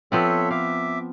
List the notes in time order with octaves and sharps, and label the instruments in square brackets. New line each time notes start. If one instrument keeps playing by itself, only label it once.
[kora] F3 B3 C4 [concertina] A4 C#5 E5
[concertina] E5 D6 [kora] F5